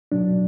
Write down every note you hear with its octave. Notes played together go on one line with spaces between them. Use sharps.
B2 F#3 D4